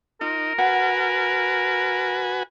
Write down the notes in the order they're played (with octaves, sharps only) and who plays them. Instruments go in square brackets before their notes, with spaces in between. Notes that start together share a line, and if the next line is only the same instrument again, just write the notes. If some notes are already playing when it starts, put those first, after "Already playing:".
[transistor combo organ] D#4 [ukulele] F4 [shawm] A#4
[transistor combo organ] F#4 B4 G#5 [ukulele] F#5